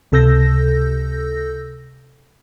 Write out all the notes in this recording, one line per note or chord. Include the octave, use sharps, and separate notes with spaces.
C#2 C3 A4 E6 G6 A#6